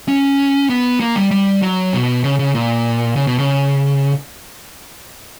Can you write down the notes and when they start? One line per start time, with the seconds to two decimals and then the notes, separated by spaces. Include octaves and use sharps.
0.08 C#4
0.70 B3
1.00 A#3
1.16 G3
1.31 G3
1.62 F#3
1.93 B2
2.24 C#3
2.39 C#3
2.55 A#2
3.16 C#3
3.27 B2
3.38 C#3